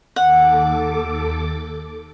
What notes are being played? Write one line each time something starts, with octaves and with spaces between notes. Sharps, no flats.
D#2 A4 F#5 D6